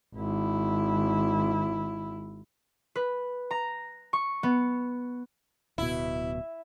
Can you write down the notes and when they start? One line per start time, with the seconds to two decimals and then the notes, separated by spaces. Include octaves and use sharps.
0.16 G#1 E4
2.95 B4
3.51 A#5
4.13 C#6
4.43 B3
5.78 D1 B2 E4